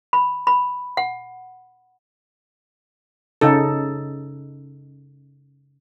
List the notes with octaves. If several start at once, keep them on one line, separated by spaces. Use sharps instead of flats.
B5
B5
F#5
C#3 D#4 A4